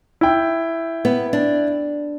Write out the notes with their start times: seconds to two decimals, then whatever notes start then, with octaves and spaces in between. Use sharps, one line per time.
0.21 E4 G5
1.05 B3
1.33 D4